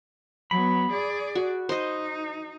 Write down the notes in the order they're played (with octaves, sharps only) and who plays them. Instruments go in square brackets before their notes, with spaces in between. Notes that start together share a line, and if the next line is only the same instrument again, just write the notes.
[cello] F#3 B3 [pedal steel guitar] B5
[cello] G#4 D5
[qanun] F#4
[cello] D#4 [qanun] C5 D#5